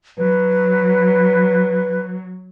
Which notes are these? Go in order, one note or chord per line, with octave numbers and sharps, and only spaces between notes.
F#3 B4